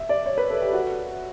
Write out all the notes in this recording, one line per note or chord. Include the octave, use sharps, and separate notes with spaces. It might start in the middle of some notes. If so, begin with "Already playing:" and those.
Already playing: E5
D5
C#5
B4
A4
G4
F#4